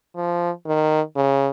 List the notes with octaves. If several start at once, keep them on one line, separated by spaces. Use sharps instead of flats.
F3
D#3
C#3